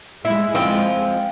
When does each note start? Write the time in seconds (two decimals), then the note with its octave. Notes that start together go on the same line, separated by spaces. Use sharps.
0.25 G#3 E4
0.55 F3 C4